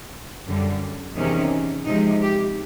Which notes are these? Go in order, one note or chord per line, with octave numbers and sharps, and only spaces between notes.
F#2 D3 G3
E2 C3 D#3 C#4
C3 F3 G#3 D#4
G4